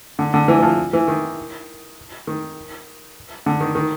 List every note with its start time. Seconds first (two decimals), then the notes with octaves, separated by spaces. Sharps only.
0.19 D3
0.34 D3
0.48 E3
0.58 E3
0.63 F3
0.93 E3
1.08 D#3
2.27 D#3
3.46 D3
3.60 D#3
3.75 D#3